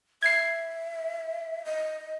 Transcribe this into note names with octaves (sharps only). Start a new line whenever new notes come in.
E5 G#6 C7
D#5